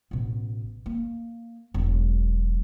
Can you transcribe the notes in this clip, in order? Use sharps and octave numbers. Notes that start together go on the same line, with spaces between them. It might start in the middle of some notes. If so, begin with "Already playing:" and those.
A1 B2
A#3
E1 F#3